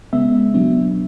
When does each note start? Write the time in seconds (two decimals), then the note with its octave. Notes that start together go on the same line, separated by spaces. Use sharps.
0.13 C#3 G#3 B3 E5
0.54 B2 F#3 B3 D4